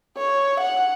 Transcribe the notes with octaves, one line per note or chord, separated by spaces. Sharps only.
C#5
F#5